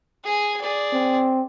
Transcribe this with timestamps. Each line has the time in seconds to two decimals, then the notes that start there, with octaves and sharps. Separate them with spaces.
0.24 G#4 G#5
0.61 G#4 D5
0.94 C4